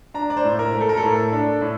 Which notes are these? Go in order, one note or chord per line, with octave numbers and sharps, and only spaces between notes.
D4 A#5
D5
C5
A2
A#4
A3
A4
A#4
A4
A2
D4
A2